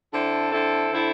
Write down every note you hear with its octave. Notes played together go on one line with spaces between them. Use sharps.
D3 C4 E4 A4
D3 C4 E4 A4
D3 C4 E4 A4